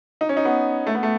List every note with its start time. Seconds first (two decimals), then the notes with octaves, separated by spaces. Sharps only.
0.21 D#4
0.29 C#4
0.37 D#4
0.45 B3
0.87 A3
0.95 B3
1.03 A3